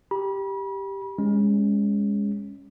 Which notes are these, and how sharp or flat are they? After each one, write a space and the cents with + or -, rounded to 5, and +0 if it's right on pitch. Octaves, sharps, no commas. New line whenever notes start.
G4 +0 B5 -35
G#3 -20 C#4 +0